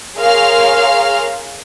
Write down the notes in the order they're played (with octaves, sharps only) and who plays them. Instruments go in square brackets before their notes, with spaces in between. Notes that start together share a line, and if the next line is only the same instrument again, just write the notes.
[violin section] G#4 A#4 C#5 F5 C6 F6